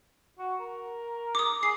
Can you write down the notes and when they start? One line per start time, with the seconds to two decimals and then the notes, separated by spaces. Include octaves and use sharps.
0.39 F#4
0.60 A#4
1.35 D6 D#6
1.63 G#4 C7